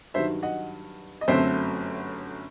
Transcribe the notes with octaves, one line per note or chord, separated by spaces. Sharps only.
G2 D#3 F#3 C5 E5
D#5 F#5
D#5
G1 F#2 F#3 A3 C4 C5 E5